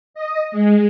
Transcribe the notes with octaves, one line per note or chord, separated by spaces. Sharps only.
D#5
G#3